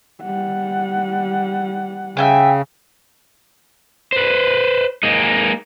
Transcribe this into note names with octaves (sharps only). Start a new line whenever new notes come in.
G3 F#5
C#3 E5 G5 G#5
B4 C5
G#3 A#3 D#4